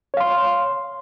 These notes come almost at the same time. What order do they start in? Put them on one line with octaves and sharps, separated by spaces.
C#5 F5 C6